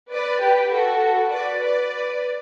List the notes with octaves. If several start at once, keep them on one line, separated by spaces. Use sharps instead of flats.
B4 D5
G4 B4
F#4 A4
B4 D5
B4 D5